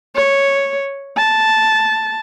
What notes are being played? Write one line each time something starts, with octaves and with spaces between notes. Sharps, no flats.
C#5
A5